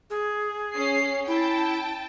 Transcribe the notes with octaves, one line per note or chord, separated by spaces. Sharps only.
G#4
C#4 C7
E4 G5 A5